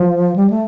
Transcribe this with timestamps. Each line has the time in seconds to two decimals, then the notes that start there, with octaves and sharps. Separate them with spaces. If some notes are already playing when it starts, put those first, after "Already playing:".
Already playing: F3
0.36 G3
0.50 A3